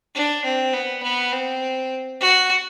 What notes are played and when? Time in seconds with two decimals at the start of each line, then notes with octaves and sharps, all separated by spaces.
0.15 D4
0.45 C4
0.74 B3
1.03 B3
1.32 C4
2.21 F#4